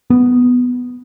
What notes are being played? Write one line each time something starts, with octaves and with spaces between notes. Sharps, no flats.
B3